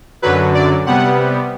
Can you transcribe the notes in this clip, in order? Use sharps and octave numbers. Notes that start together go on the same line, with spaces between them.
F#2 D3 F#3 B4
D5
C3 G3 B3 F#5